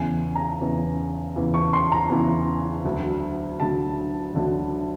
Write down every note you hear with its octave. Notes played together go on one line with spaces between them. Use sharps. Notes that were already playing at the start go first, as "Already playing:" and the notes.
Already playing: E2 C#3 E3 G#5
A#5
E2 C#3 E3
E2 C#3 E3
C#6
C6
A#5
E2 C#3 E3
D2 D3 F#3
D2 D3 F#3 A5
D2 D3 F#3